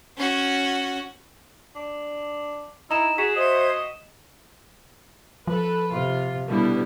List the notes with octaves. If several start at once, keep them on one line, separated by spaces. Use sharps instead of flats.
C#4 F#4
D4
D#4 E4 A#5 E7
F#4 G#4 B6 E7
C5 D#5 E5 G#6
F3 A4 B4
C3 F4
B2 D3 G3 B3 E4